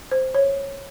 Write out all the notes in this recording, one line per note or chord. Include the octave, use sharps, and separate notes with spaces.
C5
C#5